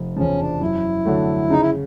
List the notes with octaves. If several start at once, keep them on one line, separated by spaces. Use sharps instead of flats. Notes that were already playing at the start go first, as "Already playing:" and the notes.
Already playing: F1
E2 C#3 F3 C#4
D4
F#2 E4
D3 F#3 A3
C#3 D#4
E4